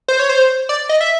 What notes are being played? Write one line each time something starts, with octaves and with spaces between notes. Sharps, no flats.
C5
C#5
C5
D5
D#5
E5